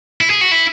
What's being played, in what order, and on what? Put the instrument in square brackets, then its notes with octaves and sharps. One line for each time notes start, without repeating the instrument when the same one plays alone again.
[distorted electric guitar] E4
G#4
F#4
E4